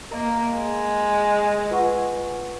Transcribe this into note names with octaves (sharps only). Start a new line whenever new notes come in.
A#3 A#4 D#5 A#5
G#3
F4 B4 F#5 C#6